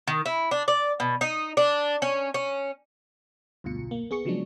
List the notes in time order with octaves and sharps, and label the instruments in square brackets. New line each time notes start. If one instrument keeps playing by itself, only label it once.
[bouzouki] D#3
E4
D4
D5
B2
D#4
D4
C#4
C#4
[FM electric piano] D2 G2 B2 F4 C#7
B1
A#3
B3 G#4 C#6 C#7
C#3 F3 F#3 G#3 D4